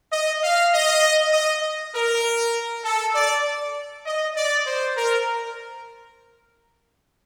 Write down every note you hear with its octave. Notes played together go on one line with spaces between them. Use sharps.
D#5
F5
D#5
D#5
A#4
A4
D5
D#5
D5
C5
A#4